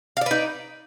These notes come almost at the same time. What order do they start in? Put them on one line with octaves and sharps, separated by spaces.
F5 D5 B4 D#4